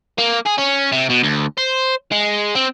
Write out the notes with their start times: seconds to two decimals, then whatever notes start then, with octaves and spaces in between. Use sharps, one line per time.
0.19 A#3
0.46 G#4
0.58 C#4
0.92 C3
1.10 B2
1.23 D2
1.58 C5
2.12 G#3
2.56 C4